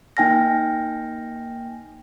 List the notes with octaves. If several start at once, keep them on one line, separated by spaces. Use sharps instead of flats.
A#3 D#4 G5 G#5 F6 A#6